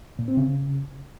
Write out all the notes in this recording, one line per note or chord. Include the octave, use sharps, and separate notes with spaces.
A#2
C4
C#3